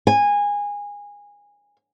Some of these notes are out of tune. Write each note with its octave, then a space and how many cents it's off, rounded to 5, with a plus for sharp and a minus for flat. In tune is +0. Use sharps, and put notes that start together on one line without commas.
G#5 -20